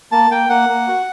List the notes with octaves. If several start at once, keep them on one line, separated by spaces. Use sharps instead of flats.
A#3 A5
A#3 G5
A#3 F#5
A#3
F#4